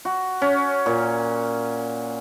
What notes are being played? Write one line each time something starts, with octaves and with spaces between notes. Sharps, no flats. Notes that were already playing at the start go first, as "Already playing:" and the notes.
F#4
C#4
A#2